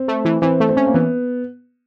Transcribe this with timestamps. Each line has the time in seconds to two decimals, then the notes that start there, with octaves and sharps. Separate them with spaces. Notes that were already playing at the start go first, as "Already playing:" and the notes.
Already playing: C4
0.08 A3
0.25 E3
0.42 E3 C4
0.60 A3
0.69 C4
0.77 C#4
0.87 A#3
0.94 E3 B3